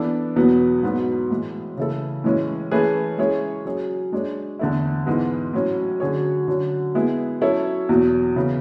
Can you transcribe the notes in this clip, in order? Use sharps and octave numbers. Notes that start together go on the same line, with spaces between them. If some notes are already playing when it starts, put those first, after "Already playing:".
Already playing: E3 B3 D4 A4
E2 B2 F#3 B3
G#2 F#3 B3
A2 E3 G#3
C#3 E3 A3 E4 A4
A2 E3 G#3 C#4
E3 A3 C#4 G#4 B4
G#3 C#4 E4 G#4 C#5
F#3 C#4 G#4 C#5
G#3 D4 G#4 C#5
E2 D3 A3 E4
G#2 E3 G#3 B3
A2 F#3 C#4
D3 F#3 C#4 G#4 C#5
D3 F#3 C#4
G#3 B3 E4 G#4
F#3 C#4 E4 A4 C#5
E2 B2 F#3
C#3 E3 B3 E4